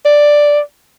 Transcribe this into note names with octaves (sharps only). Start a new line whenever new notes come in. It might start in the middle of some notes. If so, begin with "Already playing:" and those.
D5